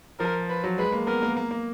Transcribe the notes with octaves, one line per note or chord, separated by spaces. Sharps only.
F3 A#4
B4
F#3
G#3 B4
A#3
B3 A#4
A#3
A#3
A#3